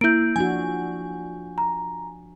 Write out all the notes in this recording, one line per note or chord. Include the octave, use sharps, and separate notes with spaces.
A#3 E4 G6 D7
F3 D4 F#4 G#5
A#5